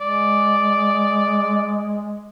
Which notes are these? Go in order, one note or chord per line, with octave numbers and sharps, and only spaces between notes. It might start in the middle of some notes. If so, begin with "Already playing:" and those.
G#3 D5